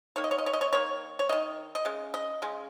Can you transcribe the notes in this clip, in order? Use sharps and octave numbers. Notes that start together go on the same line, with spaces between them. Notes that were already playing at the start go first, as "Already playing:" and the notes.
D#3 A#3 C#5
D#5
C#5
D#5
C#5
D#5
C#5
D#3 A#3 C#5
C#5
D#3 A#3 D#5
D#5
C#3 G#3
D#5
C#3 G#3